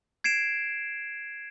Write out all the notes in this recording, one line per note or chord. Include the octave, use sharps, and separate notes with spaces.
G#6 C7 D7 E7